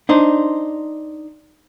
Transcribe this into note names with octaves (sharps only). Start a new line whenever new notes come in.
D4 D#4 C5